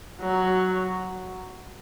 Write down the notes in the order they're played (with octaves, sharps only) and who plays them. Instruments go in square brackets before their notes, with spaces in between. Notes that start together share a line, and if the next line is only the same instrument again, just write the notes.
[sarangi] F#3